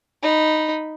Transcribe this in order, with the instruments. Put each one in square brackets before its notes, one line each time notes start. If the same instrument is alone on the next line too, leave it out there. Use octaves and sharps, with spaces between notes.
[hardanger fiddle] D#4 B5